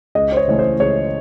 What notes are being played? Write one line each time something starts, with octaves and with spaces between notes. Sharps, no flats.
C#2 D#5
C5
C#5
C#3 E3 A3 C#4 C#5
C5
C#2 C#5